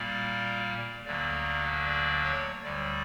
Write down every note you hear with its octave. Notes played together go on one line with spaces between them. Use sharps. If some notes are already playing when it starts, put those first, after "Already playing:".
Already playing: A#2 G3 A#3 D5
D2 D3 F#3 A#3 D5
D5
C#5
D2 D3 G3 D5